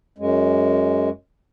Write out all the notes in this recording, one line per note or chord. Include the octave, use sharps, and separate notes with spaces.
F#2 G#3